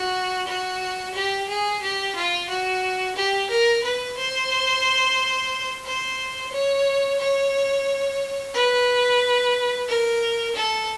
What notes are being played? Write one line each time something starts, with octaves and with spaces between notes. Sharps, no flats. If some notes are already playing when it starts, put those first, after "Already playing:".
Already playing: F#4
F#4
G4
G#4
G4
F4
F#4
G4
A#4
B4
C5
C5
C#5
C#5
B4
A#4
A4